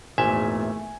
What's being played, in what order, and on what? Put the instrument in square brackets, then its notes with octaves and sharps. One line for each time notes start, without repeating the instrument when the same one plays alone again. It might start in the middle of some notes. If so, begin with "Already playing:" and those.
[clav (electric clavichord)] G#1 A#2 E5 [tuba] E2 [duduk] A3 [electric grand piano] G#5